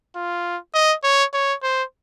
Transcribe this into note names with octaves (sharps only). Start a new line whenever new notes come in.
F4
D#5
C#5
C#5
C5